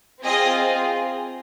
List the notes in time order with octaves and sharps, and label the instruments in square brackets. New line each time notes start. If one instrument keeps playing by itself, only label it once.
[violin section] C4 F4 G#4 D#5